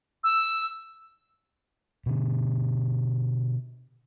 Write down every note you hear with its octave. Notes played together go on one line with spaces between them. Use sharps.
E6
B2 D3